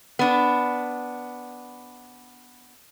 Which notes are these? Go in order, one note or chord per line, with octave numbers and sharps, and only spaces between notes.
B3 D4